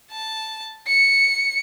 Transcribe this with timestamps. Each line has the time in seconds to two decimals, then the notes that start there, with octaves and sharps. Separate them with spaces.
0.11 A5
0.87 C#7